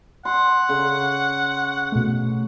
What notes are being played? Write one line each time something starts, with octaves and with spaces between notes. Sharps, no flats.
F#5 C6
C#3
B2 A3